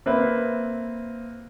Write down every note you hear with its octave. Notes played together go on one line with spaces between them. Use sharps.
A#3 C4 B4 E5